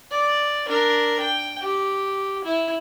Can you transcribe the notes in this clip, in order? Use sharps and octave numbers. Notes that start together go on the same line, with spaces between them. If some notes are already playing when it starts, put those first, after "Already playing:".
D5
D4 A#4
G5
G4
E4